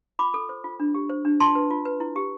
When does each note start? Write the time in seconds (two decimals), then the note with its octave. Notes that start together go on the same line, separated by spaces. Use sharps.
0.19 F4 B5 D6
0.34 A4
0.49 C5
0.64 F4
0.80 D4
0.94 G4
1.10 C5
1.25 D4
1.40 F4 A5 C6
1.55 B4
1.70 F4
1.85 B4
2.00 E4
2.16 G4